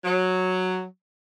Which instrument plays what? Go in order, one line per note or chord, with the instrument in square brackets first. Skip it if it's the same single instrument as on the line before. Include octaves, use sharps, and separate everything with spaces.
[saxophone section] F#3